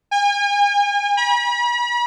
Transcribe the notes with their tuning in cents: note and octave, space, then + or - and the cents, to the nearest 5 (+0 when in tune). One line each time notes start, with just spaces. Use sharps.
G#5 -40
B5 -40